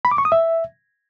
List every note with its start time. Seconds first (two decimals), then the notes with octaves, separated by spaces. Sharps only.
0.05 B5
0.11 D6
0.18 C#6
0.25 D#6
0.32 E5